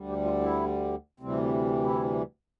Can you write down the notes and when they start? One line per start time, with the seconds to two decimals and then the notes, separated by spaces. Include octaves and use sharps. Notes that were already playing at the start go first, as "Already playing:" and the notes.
Already playing: D2 D3 G3
0.09 G4
0.24 F4
0.41 E4
1.20 D2 C3 E3 G3 C4
1.83 E4